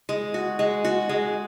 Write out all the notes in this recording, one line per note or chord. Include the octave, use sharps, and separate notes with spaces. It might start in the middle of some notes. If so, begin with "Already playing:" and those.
G#3
F#4
G#3
F#4
G#3